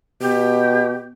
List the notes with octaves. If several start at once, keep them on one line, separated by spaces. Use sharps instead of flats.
B2 G4